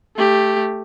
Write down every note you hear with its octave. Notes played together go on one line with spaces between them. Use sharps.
A3 G4